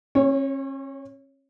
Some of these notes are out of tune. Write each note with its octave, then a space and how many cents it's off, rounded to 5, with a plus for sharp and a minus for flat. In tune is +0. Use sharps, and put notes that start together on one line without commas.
C#4 -40 C#5 +0